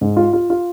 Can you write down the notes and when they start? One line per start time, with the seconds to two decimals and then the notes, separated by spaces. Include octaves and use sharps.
0.01 G#2
0.17 F4
0.33 F4
0.50 F4